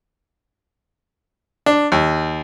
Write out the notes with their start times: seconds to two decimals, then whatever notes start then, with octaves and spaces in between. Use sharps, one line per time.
1.66 D4
1.92 D#2